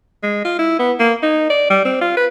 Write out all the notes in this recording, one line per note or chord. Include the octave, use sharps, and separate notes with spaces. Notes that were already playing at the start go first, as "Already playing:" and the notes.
G#3
F4
E4
B3
A#3
D#4
D5
G3
C4
F4
B4